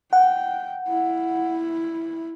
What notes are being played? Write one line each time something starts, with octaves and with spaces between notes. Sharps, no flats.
F#5 G5
E4